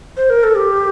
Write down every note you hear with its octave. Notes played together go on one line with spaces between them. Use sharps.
C5
A#4
A4
G4